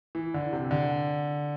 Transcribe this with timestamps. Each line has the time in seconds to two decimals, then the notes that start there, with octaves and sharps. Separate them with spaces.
0.15 E3
0.34 D3
0.52 C3
0.71 D3